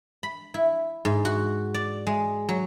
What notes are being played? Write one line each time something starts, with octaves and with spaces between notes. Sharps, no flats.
B5
E4
G#2
F#4
D5
G#3
F#3